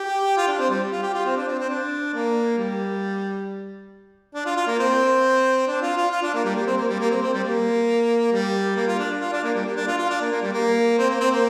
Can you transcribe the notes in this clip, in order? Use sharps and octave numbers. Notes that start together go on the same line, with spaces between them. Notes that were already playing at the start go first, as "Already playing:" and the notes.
Already playing: G4
F4
D4
C4
G3
F4
G4
F4
C4
D4
C4
C4
D4
A#3
G3
D4
F4
F4
A#3
C4
D4
F4
F4
F4
D4
A#3
G3
A#3
C4
A#3
G3
A#3
C4
C4
G3
A#3
G3
A#3
F4
D4
F4
D4
A#3
G3
A#3
D4
F4
F4
D4
A#3
A#3
G3
A#3
C4
A#3
C4
A#3